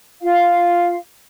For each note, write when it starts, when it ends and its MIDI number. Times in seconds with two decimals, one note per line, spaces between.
0.22 0.96 65
0.22 0.96 77